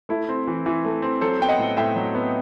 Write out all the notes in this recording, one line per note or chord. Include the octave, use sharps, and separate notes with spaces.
A3 E4
C4
E3
E3
A3
C4
F#3 A4 C5
B3 G5
D#5 F#5
A2
A2 E5 G5
F#3
B3